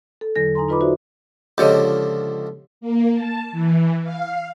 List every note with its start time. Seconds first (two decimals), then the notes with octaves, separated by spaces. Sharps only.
0.21 A4
0.36 E2 D3 F#3 A4 A#6
0.55 D#4 G#5 A#5 C6
0.69 D#4 F4 B4 D#5 B5 D6
0.81 D#4 E4 F#4 C5 D5 E5
1.58 C#2 D3 F3 G4 C#5 D#5
2.81 A#3
3.14 A5
3.52 E3
4.03 F5